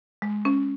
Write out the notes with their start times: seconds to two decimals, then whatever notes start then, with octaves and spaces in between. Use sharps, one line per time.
0.22 G#3
0.45 C#4